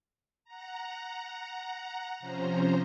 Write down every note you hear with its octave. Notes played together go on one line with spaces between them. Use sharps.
F#5 A#5
C3 F3 C#4 C5 A#5